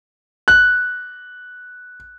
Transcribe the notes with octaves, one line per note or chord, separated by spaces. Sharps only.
F#6